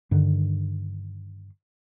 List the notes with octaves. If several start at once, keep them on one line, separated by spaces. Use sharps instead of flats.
G2 D3 D#3